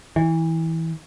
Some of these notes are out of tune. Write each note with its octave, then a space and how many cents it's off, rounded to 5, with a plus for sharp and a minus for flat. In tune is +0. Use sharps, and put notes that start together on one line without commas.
E3 -20